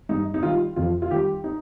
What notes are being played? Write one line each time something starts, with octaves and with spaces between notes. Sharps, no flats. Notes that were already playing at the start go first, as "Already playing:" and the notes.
G2 D#4
D#4
D#3 G3 F4
F2 F4
F4
D#3 G3 G4
D#4